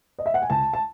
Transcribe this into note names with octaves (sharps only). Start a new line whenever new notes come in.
D#5
E5
F#5
G#5
C#2 A5
A5